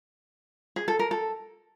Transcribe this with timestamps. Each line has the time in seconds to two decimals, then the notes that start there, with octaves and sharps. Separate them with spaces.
0.76 G#4
0.88 A4
0.99 A#4
1.11 A4